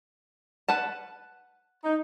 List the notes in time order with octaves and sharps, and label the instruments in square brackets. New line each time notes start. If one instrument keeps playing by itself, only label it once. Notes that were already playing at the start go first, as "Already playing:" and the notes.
[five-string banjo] B4 F#5 A5
[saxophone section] D#4